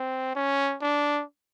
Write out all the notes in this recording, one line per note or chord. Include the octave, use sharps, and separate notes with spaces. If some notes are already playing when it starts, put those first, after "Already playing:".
Already playing: C4
C#4
D4